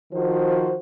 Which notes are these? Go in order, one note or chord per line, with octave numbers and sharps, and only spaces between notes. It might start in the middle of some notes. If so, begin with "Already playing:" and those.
D#3 F3 F#4 C5